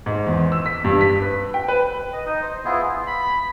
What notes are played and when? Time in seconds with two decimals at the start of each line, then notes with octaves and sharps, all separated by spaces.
0.06 G#2
0.27 E2
0.52 E6
0.66 B6
0.84 G2
1.01 B6
1.22 B4
1.54 G5
1.68 B4
2.13 D#5
2.26 D#4 D#5
2.42 C5
2.65 B3 E4 F4 G#4
3.08 B5